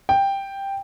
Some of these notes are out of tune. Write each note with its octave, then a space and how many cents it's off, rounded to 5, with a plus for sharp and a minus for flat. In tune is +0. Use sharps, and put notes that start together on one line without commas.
G5 +5